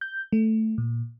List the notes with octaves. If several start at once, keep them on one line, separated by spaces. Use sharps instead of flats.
G6
A3
A#2